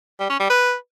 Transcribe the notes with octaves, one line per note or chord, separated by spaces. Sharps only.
G3
C#4
G3
B4